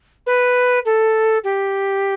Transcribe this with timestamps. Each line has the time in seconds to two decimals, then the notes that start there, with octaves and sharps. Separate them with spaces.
0.27 B4
0.85 A4
1.44 G4